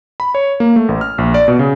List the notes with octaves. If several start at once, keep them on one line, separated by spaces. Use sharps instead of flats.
B5
C#5
A#3
A3
A1
F6
A#1
D5
B2
C#3